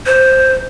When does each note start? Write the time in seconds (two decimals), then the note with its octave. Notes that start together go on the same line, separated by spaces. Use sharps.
0.06 C5